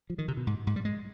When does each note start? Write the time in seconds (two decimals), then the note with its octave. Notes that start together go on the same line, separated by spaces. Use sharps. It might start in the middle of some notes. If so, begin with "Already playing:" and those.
0.10 F3
0.18 D#3
0.28 C3
0.37 B2
0.47 G#2
0.67 G#2
0.76 G3
0.85 G#3